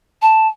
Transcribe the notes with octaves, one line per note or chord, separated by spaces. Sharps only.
A5